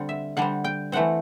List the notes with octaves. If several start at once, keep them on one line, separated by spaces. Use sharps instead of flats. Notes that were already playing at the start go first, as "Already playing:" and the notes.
Already playing: D3 G3 C4 F#5
E5
D3 G3 C4 F#5
G5
E3 A3 C4 F#5